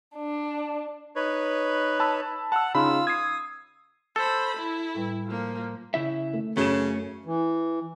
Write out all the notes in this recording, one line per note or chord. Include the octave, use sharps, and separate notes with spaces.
D4
D#4 B4 C#5
A5 B5 E6
F#5 A5 E6
C#3 D#4 F4 B5 E6
D#6 G#6 C7
A4 C5 B5
E4
A2 G3 B4
F3 A#3
C#3 E4 E5
A3
F#2 C#3 A3 C#4 E7
E3